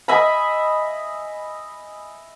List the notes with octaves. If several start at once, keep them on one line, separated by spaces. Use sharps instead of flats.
D#5 E5 G#5 B5